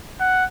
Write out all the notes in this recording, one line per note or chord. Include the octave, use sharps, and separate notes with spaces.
F#5